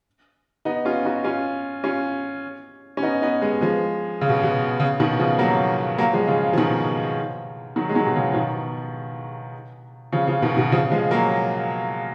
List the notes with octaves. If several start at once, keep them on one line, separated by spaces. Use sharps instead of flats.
B3 D#4
C#4 F4
D#4 F#4
C#4 F4
C#4 F4
C#4
B3 D#4
B3 D#4
G#3 B3
F3 G#3
C#3
B2
B2
C#3
B2 D#3
C#3 F3
F#3 A#3
F#3 A#3
F3 G#3
C#3 F3
F3
B2 D#3
D#3 F#3
G#3
D#3 F#3
B2
C#3
F3
B2 D#3
C#3 F3
C#3 F3
B2 D#3
B2 D#3
C#3 F3
F3 G#3
F#3 A#3